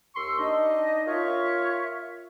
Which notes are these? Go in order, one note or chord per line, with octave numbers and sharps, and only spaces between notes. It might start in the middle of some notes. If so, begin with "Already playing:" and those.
D#2 C6 C#6 E6
D4 D#4 D#5
F4 A#4 C#5 E5